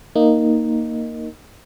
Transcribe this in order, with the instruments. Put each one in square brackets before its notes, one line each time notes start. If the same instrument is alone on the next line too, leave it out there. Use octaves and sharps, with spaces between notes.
[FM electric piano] A#3 D#4